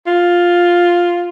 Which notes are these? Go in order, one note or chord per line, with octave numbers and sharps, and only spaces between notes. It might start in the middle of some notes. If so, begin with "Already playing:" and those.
F4